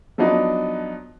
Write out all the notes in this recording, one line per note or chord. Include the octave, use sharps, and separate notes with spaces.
F3 F#3 B3 D4 D#4